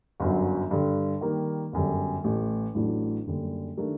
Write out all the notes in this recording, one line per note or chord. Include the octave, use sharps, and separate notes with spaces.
G1 F#2 F#3
G2 D3 G3
D#3 G3 A#3
G1 F#2 D3 G3
A1 A2 A3
A1 A2 F#3 A3 D4
F#1 F#2 D3 G3
D#3 A3 D4 G4 A#4